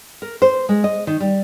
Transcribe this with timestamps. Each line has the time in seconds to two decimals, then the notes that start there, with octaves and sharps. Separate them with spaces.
0.22 A#4
0.42 C5
0.69 G#3
0.84 D#5
1.07 D#3
1.20 G3